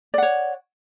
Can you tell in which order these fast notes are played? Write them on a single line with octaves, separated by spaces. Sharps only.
D5 F#5 C#5